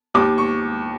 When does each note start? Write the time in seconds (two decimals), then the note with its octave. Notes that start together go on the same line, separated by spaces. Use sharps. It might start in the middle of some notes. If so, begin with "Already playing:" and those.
0.14 D#2 D6
0.38 C#6